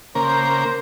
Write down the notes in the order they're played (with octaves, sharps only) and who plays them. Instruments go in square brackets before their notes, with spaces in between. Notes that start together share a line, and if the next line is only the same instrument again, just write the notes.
[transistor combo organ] C#3 A#3 A#4 [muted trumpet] C5